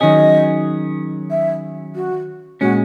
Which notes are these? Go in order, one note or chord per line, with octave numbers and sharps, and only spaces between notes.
D#3 F#3 C#4 G#4 D#5
E5
F#4
A#2 G#3 C#4 F#4